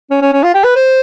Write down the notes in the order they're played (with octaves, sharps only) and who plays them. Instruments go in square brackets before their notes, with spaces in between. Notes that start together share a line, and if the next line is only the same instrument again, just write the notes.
[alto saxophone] C#4
C#4
C#4
F4
G4
B4
C5